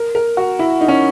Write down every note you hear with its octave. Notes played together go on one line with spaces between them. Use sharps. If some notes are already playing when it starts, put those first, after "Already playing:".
Already playing: A#4
A#4
F#4
E4
D#4
C#4